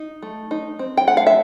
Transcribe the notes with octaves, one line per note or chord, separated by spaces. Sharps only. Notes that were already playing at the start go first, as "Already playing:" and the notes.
Already playing: D#4
A3
D#4
C4
G5
A3 F#5
F5
E5